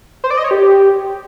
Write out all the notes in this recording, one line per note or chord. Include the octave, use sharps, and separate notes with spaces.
C5
D5
D#5
C#5
G4